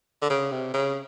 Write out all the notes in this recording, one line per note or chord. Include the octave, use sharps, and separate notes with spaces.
D3
C#3
C3
C#3